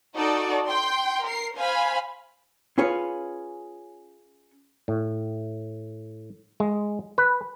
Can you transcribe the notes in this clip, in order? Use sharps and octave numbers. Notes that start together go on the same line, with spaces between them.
D#4 F#4 A4 D5
G5 C6
A#4 C7
C5 F5 G#5 B5
C#4 F4 G#4 B4 C#5
A2
G#3
B4